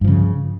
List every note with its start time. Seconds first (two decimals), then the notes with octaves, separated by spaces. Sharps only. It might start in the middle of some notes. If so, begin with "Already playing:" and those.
0.01 G2
0.04 F3
0.08 C#3